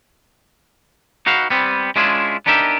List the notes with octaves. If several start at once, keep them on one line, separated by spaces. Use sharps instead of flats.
D#4 F#4 B4 F5
G3 B3 C4
G#3 C#4 D4 E4 F4 G#4
B3 D4 D#4 G4 A#4 E5